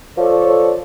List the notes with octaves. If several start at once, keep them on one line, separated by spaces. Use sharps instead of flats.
F3 A4 C#5 D5